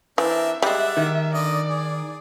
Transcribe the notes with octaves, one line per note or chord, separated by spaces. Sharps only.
E3 C4 D4 A#4 E5
G3 G#3 D5 E5 F#5
D#3
D3 D5 D#5
G#4